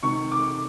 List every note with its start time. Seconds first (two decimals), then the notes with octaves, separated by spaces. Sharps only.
0.03 C3 D#3 C#6
0.32 D6